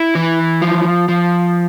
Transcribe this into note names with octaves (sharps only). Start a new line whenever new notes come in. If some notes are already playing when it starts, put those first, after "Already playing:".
Already playing: E4
E3
F3
F3